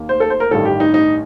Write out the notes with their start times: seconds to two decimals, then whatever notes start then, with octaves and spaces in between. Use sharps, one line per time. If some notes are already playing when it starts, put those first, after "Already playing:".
Already playing: D#2 D#3 A#3
0.09 C5
0.20 A4
0.30 C5
0.40 A#4
0.51 A1 G2 D#3 A4
0.65 G4
0.80 D#4
0.94 D#4